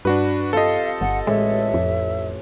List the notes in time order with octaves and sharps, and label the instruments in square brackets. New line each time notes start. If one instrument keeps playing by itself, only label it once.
[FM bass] G2 [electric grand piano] D4 F#4 B4
[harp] C4 F4 G4 [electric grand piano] A4 D#5 [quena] F5
[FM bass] G1 [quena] F#5
[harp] A1 [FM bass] G#3 [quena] E5
[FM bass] F2